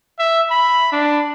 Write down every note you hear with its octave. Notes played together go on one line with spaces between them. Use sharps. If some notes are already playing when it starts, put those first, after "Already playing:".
E5
B5
D4